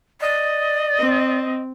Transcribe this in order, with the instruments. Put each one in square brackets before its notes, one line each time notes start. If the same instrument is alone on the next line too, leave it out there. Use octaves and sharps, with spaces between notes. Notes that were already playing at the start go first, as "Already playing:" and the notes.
[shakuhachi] D5 [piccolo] D#5
[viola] C4